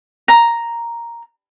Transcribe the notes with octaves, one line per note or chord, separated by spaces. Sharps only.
A#5